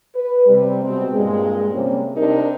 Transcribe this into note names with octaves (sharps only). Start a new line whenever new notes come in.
B4
C3 G3
B2 G#3 C4
G2 A#2 G#3
C3 G3 A#3 C4 C#4
C3 D4 D#4 A#4